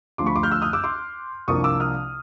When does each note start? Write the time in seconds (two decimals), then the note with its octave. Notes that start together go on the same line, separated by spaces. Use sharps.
0.18 D2 D3 F3 C6 D6
0.26 B5 C#6
0.36 C6 D6
0.43 F6 G6
0.51 E6 F#6
0.62 D#6 F6
0.73 D6 E6
0.84 C6 D6
1.48 C2 C3 F3 A#3 D4 C#6 D#6
1.64 D6 E6
1.80 D#6 F6